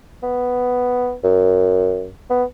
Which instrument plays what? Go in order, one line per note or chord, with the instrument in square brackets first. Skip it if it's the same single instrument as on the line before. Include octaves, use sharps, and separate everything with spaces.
[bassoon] B3
F#2
B3